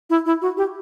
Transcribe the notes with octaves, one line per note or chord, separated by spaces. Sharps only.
E4
E4
F#4
G4